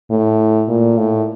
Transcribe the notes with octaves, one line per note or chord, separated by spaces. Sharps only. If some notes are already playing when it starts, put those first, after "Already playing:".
A2
A#2
A2